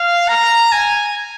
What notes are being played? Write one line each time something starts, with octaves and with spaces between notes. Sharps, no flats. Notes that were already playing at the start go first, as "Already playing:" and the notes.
Already playing: F5
A#5
G#5